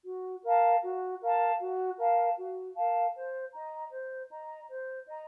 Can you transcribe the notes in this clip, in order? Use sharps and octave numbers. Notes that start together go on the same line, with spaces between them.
F#4
A#4 F5 A5
F#4
A#4 F5 A5
F#4
A#4 F5 A5
F#4
A#4 F5 A5
C5
D#5 A#5
C5
D#5 A#5
C5
D#5 A#5